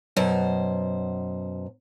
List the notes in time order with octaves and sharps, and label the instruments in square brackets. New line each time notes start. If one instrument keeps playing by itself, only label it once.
[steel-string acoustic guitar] F#2 B2 C5